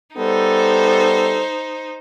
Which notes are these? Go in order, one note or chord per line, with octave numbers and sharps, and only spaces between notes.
G3 B3 D#4 A4 C5